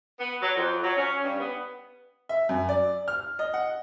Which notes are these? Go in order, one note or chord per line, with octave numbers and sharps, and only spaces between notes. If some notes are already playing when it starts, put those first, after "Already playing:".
B3
F#3
F2
F#3
C#4
G2
B3
E5
F#2
D5
F6
D#5
F#5